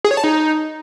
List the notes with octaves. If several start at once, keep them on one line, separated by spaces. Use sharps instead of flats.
G#4
C#5
A5
D#4